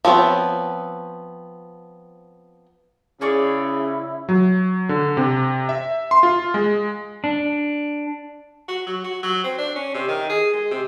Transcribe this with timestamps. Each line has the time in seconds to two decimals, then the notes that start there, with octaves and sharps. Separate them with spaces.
0.05 F3 B3 C4 C#5
3.21 C#3 E4 G#4 D5 C#6
4.29 F#3
4.89 D3
5.17 C3
5.69 E5
6.11 C6
6.23 F4
6.54 G#3
7.24 D4
8.68 F#4
8.87 F#3
9.04 F#4
9.23 F#3
9.44 C4
9.58 D4
9.76 C#4
9.94 C3
10.08 D#3
10.29 G#4
10.53 G#3
10.71 C3